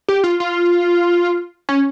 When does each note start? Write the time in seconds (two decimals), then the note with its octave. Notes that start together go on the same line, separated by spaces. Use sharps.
0.09 G4
0.24 F4
0.40 F4
1.69 C#4